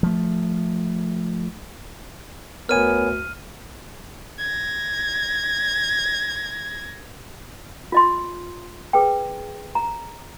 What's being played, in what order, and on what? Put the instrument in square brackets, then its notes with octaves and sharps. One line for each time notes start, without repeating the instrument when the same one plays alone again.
[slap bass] F3 A3
[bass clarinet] D2 [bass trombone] B3 [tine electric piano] A#4 C#5 G#5 [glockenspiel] F6 D#7
[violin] G#6 A#6
[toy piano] F4 D#5 C6
G#4 B4 G5
A#5